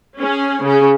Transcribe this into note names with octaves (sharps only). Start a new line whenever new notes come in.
C#4 G#4
C#3 C#4